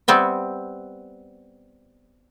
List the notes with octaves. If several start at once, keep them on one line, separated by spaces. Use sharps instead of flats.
G3 B3 C4 E5